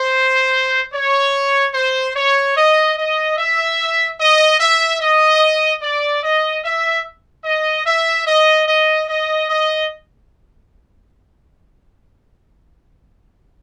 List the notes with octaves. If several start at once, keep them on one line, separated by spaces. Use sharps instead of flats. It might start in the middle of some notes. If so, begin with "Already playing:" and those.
Already playing: C5
C#5
C5
C#5
D#5
D#5
E5
D#5
E5
D#5
D5
D#5
E5
D#5
E5
D#5
D#5
D#5
D#5